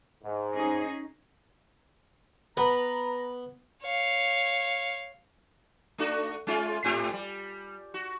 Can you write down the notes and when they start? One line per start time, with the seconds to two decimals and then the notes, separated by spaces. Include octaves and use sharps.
0.23 G#2
0.54 C#4 D#4 G#4
2.57 B3 B4 A#5
3.83 C#5 F5
5.98 A3 D4 F#4
6.47 G#3 C#4 F4
6.84 G#2 C4 G4
7.13 G3
7.94 F#4